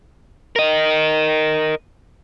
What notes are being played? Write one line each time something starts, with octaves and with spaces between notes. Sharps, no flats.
A#4 D#5